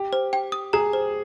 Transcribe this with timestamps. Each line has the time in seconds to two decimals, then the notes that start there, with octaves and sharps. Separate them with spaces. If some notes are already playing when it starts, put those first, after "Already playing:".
Already playing: G4
0.13 C5
0.33 G5
0.52 D#6
0.73 G#4 A#5
0.93 C5